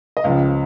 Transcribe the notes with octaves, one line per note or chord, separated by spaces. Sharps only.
D#5
C#2 C#3 F3 F5